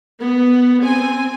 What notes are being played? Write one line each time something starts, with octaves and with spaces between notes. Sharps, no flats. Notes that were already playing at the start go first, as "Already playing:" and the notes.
B3
C4 G#5